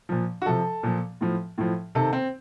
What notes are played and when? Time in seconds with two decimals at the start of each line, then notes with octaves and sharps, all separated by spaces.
0.09 A#2 F3
0.42 F#4
0.46 C3 F3 A4
0.83 A#2 F3
1.21 A2 F3
1.58 A2 F3
1.95 C3 D#3 A4
2.13 C4